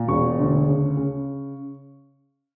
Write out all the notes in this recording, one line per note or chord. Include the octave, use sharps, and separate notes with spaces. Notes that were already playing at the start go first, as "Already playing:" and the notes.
Already playing: A#2
E1 C#6
D2
C#3
C#3